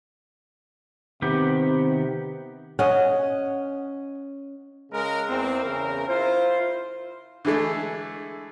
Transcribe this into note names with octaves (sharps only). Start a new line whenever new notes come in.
C3 D#3 B3 G4
C#4 D#5 F#5
C#3 G#3 A#4
E2 C4
E2 C#3 A#4
E4 F4 C5
D3 E3 G#3 A3